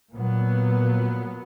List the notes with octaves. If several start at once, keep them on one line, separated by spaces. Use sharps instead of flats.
A#2 F#3 B3